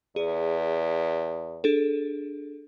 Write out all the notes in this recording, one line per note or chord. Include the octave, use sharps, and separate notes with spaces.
E2 G#4
D4 G#4 A4